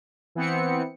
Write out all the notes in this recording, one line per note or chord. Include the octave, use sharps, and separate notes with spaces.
E3 B3 C4 C#7